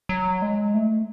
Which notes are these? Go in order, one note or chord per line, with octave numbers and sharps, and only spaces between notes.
F#3
G#3
A3